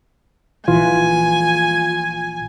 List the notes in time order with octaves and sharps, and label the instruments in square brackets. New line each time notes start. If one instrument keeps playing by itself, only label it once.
[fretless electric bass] A#1 E3 [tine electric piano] F4 [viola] G#5